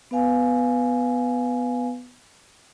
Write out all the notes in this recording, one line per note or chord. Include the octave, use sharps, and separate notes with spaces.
B3 B4 F5 G#5